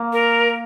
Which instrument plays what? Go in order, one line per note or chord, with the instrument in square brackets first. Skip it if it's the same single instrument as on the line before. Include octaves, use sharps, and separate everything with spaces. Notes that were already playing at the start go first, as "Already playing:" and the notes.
Already playing: [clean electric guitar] A#3
[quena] A#4
A#4